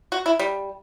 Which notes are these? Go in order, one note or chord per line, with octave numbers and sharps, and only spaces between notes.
F#4
E4
G3